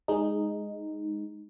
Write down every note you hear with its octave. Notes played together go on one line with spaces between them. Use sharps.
G#3 D#4